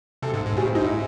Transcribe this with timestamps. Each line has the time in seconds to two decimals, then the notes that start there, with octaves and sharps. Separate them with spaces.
0.22 C3 A4
0.34 G#2
0.46 G#2
0.57 A2 G#4
0.66 C4
0.75 G#2 D#4
0.83 E4